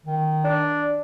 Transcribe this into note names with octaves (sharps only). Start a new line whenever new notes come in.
D#3
D4